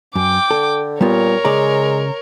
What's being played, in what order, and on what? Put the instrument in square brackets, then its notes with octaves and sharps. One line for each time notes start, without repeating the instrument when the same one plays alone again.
[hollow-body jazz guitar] F#2 [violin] G5 D6
[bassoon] D3 [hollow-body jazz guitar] A4
[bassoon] A#2 [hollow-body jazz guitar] G3 B3 F4 [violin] A#4 C#5
[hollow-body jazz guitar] C#3 D5 A#5 [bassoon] G#3